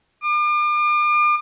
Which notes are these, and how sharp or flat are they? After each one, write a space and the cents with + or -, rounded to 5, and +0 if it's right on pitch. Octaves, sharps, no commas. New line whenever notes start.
D6 +40